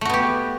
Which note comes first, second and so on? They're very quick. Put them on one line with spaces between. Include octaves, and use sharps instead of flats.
A3 F#4 B3 G4